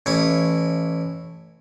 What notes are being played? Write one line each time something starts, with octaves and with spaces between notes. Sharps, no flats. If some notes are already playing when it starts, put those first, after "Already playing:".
A1 E4 C#5